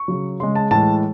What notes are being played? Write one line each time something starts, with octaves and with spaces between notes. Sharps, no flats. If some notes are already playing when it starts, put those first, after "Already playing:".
Already playing: C#6
C#3 F#3
C#3 G#3 C6
A5
A2 E3 G#3 A5